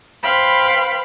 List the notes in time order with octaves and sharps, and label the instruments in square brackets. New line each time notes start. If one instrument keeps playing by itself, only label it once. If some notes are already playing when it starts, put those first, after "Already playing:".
[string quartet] B4 C5 F5 G5 B5